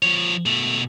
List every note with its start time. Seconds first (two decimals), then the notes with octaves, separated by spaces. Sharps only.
0.02 F3 C#5
0.46 B2 A3